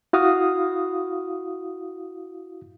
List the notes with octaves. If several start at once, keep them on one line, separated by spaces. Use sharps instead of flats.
E4 F#4 F5 D#6